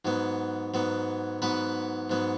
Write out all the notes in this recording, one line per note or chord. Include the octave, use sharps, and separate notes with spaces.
G#2 F#3 B3
G#2 F#3 B3
G#2 F#3 B3 B4
G#2 F#3 B3